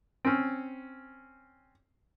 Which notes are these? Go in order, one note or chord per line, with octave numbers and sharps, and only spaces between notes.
C4 C#4